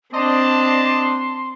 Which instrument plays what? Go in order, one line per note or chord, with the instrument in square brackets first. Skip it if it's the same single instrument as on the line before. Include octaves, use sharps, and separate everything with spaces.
[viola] C4 D4 [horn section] D5 D#5 A5 [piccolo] C6